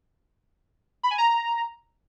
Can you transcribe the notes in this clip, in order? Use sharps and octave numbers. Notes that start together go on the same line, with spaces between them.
B5
G#5
A#5